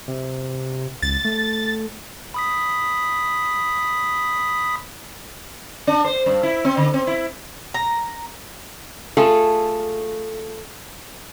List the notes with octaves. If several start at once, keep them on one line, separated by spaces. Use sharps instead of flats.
C3
C#2 A6
A3
B5 D#6 B6
D4
C5
G2
E4
C4
D3
C4
E4
A#5
A3 F4 G#4 A4